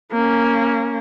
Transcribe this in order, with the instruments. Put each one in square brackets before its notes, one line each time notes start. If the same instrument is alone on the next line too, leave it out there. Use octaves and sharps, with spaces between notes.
[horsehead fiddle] A#3 C#4